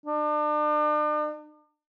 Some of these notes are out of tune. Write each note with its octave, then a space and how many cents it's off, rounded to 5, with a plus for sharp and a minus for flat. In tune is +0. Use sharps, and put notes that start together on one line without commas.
D4 +40